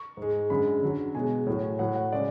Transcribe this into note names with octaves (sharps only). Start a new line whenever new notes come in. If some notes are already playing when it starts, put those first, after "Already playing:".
Already playing: C#6
G#2 G#3
F#2 D3 G#3 B5
F#2 D3 F#3
B2 G#3 G#5
A2 F#3
A2 F#3 F#5
F#5
C#3 G#3 D5